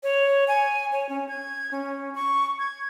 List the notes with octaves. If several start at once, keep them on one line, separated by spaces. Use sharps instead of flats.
C#5
G#5
C#5
C#4
G#6
C#4
C#6
G#6